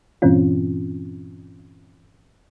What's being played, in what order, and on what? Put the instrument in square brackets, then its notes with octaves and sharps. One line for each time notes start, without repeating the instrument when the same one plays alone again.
[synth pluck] G2 A#2 E3 C4 C#4 F4